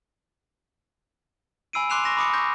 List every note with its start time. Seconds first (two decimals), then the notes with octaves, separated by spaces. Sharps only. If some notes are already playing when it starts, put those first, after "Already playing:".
1.73 G#5 B5 E6 C7 D7 D#7
1.90 C6 D6 F#6 C7 E7 F7
2.04 C#6 A#6 E7
2.17 B5 D6 D#6 C#7
2.33 C#6 G6 A#6